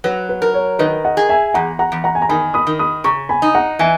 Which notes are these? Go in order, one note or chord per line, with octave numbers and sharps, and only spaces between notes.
F#3 B4
B4
A#4
C#5
D#3 B4 D#5
D#5 F#5
G#4
E5 G#5
E2 F#5 A#5
F#5 A#5
E2
F#5 A#5
G#5
A#5
D#3 G#5 B5
B5 D#6
D#3
B5 D#6
C#3 A#5 C#6
G#5 B5
D#4
F#5 A#5
E3 E5 G#5